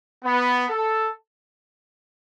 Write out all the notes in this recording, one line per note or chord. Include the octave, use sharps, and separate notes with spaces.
B3
A4